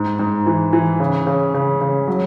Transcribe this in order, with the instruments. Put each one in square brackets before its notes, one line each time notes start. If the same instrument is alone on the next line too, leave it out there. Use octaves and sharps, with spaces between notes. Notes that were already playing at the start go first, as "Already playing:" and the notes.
Already playing: [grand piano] G#2
G#2
E3
E3
C#3
C#3
C#3
C#3
F#3